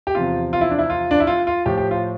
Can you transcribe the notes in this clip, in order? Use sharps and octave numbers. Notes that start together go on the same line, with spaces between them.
G4
E2 C3 F3 F4
F4
E4
D4
E4
F4
D4
E4
F4
F4
A2 F3 G4
G4
F4